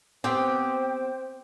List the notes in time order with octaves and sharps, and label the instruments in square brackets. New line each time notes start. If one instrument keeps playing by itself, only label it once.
[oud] B3 C4 [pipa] G4 [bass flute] C5 [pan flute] G5